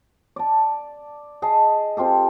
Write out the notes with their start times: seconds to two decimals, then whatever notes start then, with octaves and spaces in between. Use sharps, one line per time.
0.36 D5 A5
1.42 G#4 D#5 A5
1.97 C4 F4 G4 A4